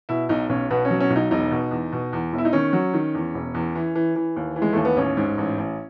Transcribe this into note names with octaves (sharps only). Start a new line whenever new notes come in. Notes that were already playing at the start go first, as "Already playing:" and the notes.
B2 E4
B1 D#4
B1 C#4
B2 B3
C#4
F#3
C#4
B1
D#4
E1 D#4
B2
E2
B2
E2
E1
E4
D#4
D#3 C#4
F#3
D#3
E2
E1
E2
E3
E3
E3
D#2
E3
G#3
D#2 A3
B3
A1 C#4
G#2
A1
A1